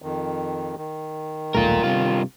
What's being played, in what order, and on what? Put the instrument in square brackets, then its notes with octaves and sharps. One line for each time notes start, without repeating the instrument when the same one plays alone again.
[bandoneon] F2 D#3
D#3
[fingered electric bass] D#1 B1 A3 [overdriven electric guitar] F4 A#4
[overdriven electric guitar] G2 F4 [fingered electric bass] C3